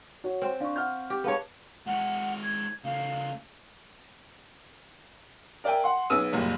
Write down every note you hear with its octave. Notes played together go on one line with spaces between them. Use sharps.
F#4 C#5
C4 C5 G#5
D4 F5 C#6
F#5 F6 G6
G4
B3 G#4 C#5 F5 A5
G#3 E4 F#5
G#6
C#3 A3 F5
A#4 D5 E5 G5 G#5
F#5 C6
B1 B3 G#4 D#6 E6 D#7
F#1 C2 F#2 A#2